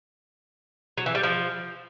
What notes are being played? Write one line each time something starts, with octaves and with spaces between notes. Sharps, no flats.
F#3
E3
G3
F3